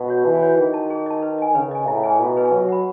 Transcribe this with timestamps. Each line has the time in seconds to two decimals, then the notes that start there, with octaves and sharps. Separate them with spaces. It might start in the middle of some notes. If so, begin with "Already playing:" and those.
Already playing: B2
0.08 F#4 C#5 F#5
0.25 E3 D#4
0.41 F#4 C#5 F#5
0.57 D#3 G#4
0.73 D#5 A5
0.90 G#4
1.06 D#5 A5
1.22 B4
1.38 D#5 G#5
1.55 C#3 B4
1.71 D#5 G#5
1.88 A2 E4
2.04 G#4 B4 D#5 G#5
2.20 B2 E4
2.37 G#4 B4 D#5 G#5
2.52 F#3 B4
2.69 F#5 B5